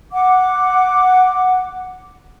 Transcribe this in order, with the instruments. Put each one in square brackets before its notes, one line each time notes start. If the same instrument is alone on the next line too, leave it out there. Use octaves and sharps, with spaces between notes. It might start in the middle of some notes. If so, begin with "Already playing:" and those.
[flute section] F#5 D6